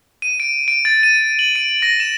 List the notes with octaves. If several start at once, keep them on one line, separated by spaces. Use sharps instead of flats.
D#7
D7
D7
A6
D#7
F#7
D7
A#6
E7